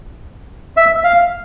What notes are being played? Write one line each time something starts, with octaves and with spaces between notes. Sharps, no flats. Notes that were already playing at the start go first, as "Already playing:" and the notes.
E5
F5